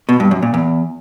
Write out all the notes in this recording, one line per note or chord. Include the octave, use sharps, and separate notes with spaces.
B2
G2
F#2
A#2
E2